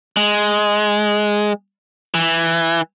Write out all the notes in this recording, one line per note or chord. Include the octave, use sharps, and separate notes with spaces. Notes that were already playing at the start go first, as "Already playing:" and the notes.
G#3
E3